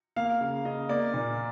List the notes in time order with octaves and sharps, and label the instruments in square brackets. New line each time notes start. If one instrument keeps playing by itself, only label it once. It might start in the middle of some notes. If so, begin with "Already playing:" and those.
[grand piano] A#3 F5
C#3
C#3 D#5
A#3 D5
A#2